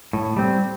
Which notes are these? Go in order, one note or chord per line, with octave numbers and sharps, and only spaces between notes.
A2
G3 C4